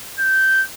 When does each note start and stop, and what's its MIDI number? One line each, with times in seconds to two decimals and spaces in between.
0.19 0.63 91